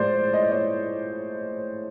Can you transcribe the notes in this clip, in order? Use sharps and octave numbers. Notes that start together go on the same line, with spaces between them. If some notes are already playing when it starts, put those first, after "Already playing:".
Already playing: A2 F3 G#3 C5 D5
D#5
D5
C#5 D#5